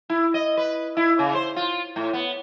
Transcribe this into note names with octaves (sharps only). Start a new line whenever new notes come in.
E4
D#5
B4
E4
C#3
C5
F4
A2
B3